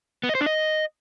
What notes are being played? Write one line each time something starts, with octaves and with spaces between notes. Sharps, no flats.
B3
D#5
C5
D4
D#5